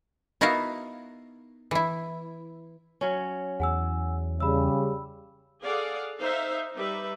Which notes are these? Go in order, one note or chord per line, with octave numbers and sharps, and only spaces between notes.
B3 D#4 E4 F#4 A#4 F5
E3 E4
F#3 C#4
E2 F#5 G#5 E6
C#3 G3 B5 E6
G#4 A4 D5 F5 F#5
D#4 C5 E5 F5
G3 D#4 B4 E5